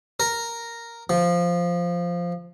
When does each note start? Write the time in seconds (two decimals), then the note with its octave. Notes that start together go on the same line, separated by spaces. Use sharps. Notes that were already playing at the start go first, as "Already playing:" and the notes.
0.20 A#4
1.10 F3